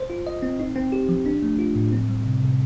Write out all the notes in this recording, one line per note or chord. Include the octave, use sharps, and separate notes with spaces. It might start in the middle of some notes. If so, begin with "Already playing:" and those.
Already playing: C5
F4
D#5
C4
D#4
C4
G4
F3
D4
A3
F4
A2
C4
G3
C3
C3